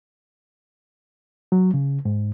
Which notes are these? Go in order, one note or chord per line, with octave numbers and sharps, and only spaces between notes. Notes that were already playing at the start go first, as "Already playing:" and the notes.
F#3
C#3
G#2